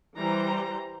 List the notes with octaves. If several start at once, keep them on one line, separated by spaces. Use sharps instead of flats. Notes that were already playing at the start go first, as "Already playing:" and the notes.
E3 G3 C5 A#5